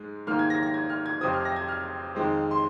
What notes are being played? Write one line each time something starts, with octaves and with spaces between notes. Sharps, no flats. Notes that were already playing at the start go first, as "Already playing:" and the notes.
Already playing: G#2 G#3
G#2 D#3 A#3 F6
G#6
A#6
A#6
G#6
F6
G#6
F2 C3 F3 C4 D#6
F6
A#6
G#6
F6
F2 D#3 G#3 C4
C6